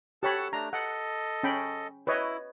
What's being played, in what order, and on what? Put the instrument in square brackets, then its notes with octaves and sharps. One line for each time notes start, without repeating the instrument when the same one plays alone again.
[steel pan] G4 C#5 B5 [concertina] A4 F#5 A5
[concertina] A3 D4 [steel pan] A#5
[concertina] A4 D#5 [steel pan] F#5
[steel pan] C#4 G5 B5
[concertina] E4 [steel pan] B4 C#5 D#5